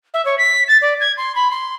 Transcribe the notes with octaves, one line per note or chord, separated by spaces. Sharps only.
E5
C#5
B6
A6
D5
G#6
C6
B5
C6